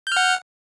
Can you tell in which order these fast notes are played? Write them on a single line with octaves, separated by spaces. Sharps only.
G6 F6 F#5